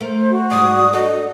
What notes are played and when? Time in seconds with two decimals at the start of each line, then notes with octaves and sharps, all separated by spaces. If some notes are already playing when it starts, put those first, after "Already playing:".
0.01 A3 A#4 C5
0.30 F#4
0.51 G#2 G3 D5 D#6
0.93 D4 A4 D#5